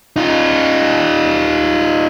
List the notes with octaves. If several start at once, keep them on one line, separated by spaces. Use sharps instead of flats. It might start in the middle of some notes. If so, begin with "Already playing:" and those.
D#4 F4